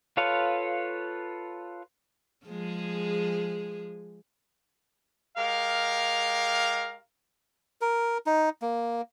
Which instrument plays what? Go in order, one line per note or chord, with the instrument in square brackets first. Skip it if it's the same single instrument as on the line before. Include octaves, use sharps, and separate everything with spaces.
[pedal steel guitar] F4 A4 B4 C#5 F5
[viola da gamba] F3 G#3 G#4
[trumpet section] G#3 G4 A#4 F5
[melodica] A#4
D#4
A#3